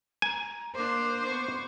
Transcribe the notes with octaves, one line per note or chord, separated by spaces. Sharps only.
G#5 A#5
A#3 D4 C5 D6
B3 C#6